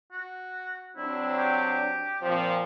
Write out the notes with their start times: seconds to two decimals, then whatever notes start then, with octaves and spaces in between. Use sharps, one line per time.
0.12 F#4
0.97 F#3 C4 D4 E4
1.38 G4
2.22 A#2 F3 C4